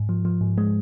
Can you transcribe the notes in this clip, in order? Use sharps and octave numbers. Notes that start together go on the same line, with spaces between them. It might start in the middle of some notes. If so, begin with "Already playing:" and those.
Already playing: G#2
F3
F3
G#2
G#3